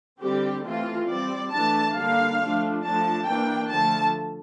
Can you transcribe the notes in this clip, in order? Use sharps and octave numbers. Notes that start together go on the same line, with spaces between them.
D3 G3 C4 G4
E3 A3 C4 F4
G3 C4 D5
E3 A3 D4 A5
D3 G3 A#3 D4 F5
F3 A3 D4
F3 A3 D4 A5
E3 A#3 D4 G5
D3 F3 A3 A5